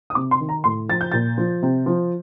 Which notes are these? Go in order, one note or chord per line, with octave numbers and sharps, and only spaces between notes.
D#6
C3 D6
C6
D#3
A#5
A2 C6
F3 A6
G6
A#2 A6
F3
C3
F3